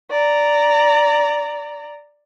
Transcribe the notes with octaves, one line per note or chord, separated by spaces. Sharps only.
D5 A#5